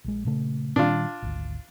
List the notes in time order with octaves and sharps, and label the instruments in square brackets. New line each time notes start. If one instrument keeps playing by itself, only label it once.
[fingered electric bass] A#1 G#3
A#2 C#3 A3
[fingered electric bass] A#2 D#3 G3 [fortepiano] D4 F4
[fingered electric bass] G#1 D2